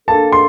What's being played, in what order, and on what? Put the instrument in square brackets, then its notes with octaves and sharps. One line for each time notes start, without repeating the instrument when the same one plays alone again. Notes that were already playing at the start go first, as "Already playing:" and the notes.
[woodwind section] A#3 D4 A4 [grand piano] A5
[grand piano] C6